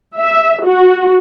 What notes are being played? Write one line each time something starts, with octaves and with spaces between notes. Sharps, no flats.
E5
F#4